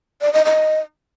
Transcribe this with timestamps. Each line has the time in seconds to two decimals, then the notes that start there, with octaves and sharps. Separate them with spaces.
0.21 D5
0.33 D#5
0.45 D#5